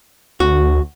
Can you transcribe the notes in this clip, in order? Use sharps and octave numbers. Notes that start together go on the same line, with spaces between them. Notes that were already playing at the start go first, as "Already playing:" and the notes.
D2 F#4